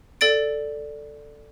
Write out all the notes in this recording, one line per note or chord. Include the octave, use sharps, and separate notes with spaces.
A4 D5 A6 D7